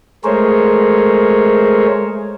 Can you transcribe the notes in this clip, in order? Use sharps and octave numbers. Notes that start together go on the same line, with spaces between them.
G#3 A3 G#4 A#4 C5 C#5